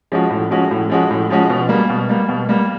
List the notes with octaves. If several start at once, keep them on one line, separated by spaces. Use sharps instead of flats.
F3 G#3 C#4 F#4
A2
F3 G#3 C#4 F#4
A2
F3 G#3 C#4 F#4
A2
F3 G#3 C#4 F#4
B2
G3 A#3
B2
G3 A#3
B2
G3 A#3